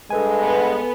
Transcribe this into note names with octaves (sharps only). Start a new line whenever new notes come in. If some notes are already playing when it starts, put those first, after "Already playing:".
G2 G#3 A4 B4 G#5
B3